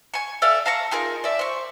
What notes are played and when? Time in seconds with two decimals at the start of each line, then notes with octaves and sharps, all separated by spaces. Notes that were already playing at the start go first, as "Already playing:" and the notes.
0.14 G#5 C#6
0.42 A4 D5 E5 F5
0.66 F5 A5 A#5 C#6
0.91 D#4 F4 G#4 A#4
1.24 D5 E5
1.39 C5 C#6